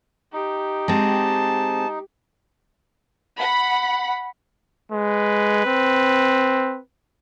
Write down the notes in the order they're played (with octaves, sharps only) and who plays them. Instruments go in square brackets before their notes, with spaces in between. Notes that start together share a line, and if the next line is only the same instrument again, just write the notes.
[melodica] D#4 [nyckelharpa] G4
[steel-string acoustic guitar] G#3 C4 [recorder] A5
[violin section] F#5 B5
[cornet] G#3 [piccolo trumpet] B4
[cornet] C4